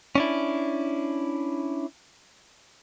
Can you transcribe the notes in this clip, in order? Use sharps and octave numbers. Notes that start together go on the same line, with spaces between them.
C#4 D4 E4